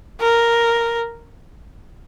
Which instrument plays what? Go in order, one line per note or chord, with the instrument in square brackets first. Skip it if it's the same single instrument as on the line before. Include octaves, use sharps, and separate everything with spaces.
[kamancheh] A#4